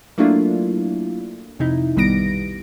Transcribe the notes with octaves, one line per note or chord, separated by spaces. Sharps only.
F#3 A3 A#3 D4 E4 F4
F2 C3 D#4 E4
B1 D#3 G3 B3 A#6 D7